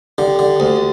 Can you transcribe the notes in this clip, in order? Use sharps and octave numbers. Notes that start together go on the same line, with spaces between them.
D3 G4
D3
D2